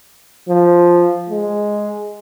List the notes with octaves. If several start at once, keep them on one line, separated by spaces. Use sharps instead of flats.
F3
G#3